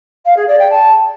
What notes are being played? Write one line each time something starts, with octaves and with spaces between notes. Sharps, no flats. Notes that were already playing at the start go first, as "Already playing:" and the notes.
F5
G#4
D5
G5
A5